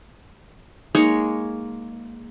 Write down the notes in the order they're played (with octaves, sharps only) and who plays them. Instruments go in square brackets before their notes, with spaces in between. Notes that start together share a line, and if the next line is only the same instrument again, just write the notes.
[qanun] G#3 A#3 C#5 [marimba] D#4